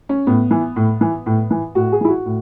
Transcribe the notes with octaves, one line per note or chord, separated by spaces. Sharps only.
C#4
A2 B3
E3
A2
E3
A2
E3
A2 F#4
G#4
E3 E4
F#4
A2